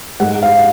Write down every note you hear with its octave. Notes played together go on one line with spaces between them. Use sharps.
G#2 F#5
F5